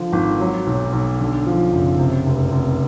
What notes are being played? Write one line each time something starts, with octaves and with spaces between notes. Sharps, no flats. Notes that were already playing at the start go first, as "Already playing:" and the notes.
Already playing: D3 F3
G#1
F#3
B1
B1
D3
F3
F#1
C3
F1
F1